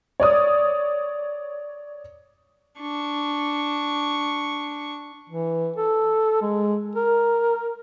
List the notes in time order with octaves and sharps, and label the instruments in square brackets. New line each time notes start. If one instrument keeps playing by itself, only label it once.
[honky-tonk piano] C#5 D5 D#6
[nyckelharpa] D4 C#6
[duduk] E3
A4
G#3
A#4